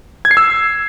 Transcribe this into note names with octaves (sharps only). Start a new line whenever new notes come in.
G#6
C7
E6